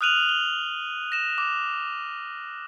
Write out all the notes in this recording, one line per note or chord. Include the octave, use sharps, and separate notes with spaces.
D#6 F6 F#6 D#7 F7 F#7
G7
A#6 E7
D6